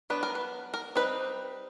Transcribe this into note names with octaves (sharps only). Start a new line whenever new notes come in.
F#3 B3 D4 B4
A#4
B4
A#4
G3 C4 D#4 B4